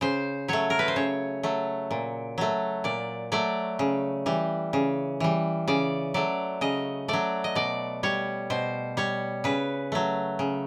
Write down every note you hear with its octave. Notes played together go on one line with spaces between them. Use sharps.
C#3 C5
F#3 A3 C#5
A#4
B4
C5
C#3 C#5
F#3 A3
A#2
F#3 A3
A#2 D5
F#3 A3 D5
C#3
E3 G3
C#3
E3 G3
C#3 D5
F#3 A3 D5
C#3 D#5
F#3 A3 D5
D#5
B2 D5
G3 C#5
B2 C5
G3 C#5
C#3 B4
F#3 A3
C#3